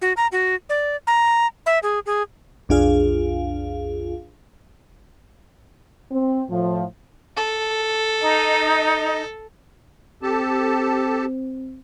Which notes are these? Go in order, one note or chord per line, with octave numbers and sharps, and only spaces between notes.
F#4
A#5
F#4
D5
A#5
E5
G#4
G#4
B1 F2 D4 F4 G#4 F5
C4
A2 F3
A4
D#4 D#5
C4 G4 A4 A5